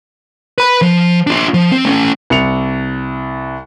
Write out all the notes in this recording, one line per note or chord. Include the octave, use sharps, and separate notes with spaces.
B4 B5
F3
D4 F4
F3
C4
A3 C#4
C2 C#7 F7